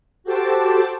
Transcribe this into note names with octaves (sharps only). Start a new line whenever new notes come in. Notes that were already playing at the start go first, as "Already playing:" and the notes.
F#4 G4 A4 C5 A5 D6